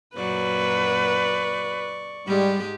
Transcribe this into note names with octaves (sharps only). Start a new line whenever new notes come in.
F#2 A#2 F#3 B4 D5 C#6
G#2 G3 G#3 G4